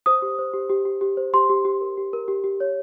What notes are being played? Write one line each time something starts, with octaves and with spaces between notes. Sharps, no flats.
C5 D#6
G4
C5
G4
G4
G4
G4
C5
G4 C6
G4
G4
A#4
G4
A#4
G4
G4
C#5